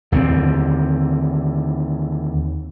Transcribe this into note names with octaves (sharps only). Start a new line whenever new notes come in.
D#2 D3 D#3 C4